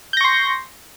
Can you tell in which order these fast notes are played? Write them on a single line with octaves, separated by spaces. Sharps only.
G6 A#6 C#6 C6